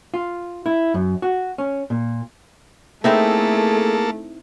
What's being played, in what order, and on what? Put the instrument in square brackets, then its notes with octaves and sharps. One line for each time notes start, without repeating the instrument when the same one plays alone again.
[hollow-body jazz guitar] F4
E4
F#2
F#4
C#4
A#2
[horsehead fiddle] A3 [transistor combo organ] A#3 A4 [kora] C4 D#4 E4 [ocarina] G#4